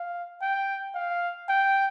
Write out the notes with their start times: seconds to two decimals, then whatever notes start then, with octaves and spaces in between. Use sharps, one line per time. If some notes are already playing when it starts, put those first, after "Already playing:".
Already playing: F5
0.42 G5
0.95 F5
1.49 G5